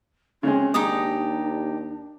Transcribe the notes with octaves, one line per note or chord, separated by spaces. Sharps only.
C#3 G#3 C4 C#4
D#2 G#3 D4 D#4 G4 D#6